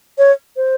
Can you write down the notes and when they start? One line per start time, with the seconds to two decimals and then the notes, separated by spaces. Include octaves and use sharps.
0.18 C#5
0.56 C5